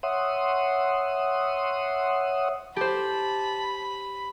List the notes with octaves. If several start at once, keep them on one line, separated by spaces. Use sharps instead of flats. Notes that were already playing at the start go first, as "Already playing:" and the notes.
C#5 E5 F#5 C6 D#6
G4 C5 A5 B5